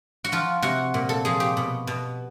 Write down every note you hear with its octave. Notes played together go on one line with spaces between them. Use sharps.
F#4
F3 F4
C3 F#4
A#2
A4
F3 G#4
G4
B2
B2